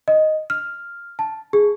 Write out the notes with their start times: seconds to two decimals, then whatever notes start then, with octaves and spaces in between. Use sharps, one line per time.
0.08 D#5
0.50 F6
1.19 A5
1.53 G#4